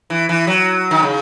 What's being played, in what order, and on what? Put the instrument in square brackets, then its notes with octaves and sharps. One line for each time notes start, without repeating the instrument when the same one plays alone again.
[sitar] E3
E3
F#3
D#3
C#3